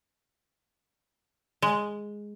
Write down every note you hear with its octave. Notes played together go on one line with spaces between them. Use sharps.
G#3